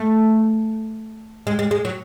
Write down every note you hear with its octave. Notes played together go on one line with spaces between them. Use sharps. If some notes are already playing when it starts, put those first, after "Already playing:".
Already playing: A3
G#3
G#3
G#3
F#3